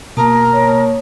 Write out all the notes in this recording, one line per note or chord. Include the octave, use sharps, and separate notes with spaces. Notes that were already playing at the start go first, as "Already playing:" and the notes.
B2 A#3 A#4 A5 D#6
C#5